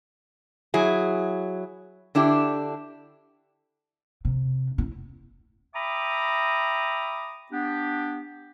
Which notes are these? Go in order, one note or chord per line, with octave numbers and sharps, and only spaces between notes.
F#3 E4 G#4
D3 D4 E4 G4
C3
E4
E5 G5 A#5 B5 D6 D#6
B3 D4 G4